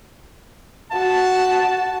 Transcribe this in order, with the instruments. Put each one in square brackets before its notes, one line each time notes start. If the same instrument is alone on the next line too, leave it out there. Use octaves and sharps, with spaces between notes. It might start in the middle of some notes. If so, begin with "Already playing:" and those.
[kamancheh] F#4 [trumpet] A5